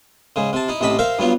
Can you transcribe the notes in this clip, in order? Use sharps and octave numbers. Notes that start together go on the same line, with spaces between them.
G#2 C#3
C3 A5
D#4 E4
A1 C3 D#5 A5 B5
A#4 C5 E5 F5
G2 F#3 B3 F4